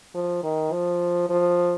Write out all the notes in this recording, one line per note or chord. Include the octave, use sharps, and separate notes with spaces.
F3
D#3
F3
F3